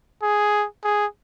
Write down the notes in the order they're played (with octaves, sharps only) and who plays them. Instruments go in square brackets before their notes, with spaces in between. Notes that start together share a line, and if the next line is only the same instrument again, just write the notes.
[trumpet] G#4
G#4